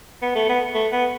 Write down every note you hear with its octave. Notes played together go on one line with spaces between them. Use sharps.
B3
A3
B3
A3
B3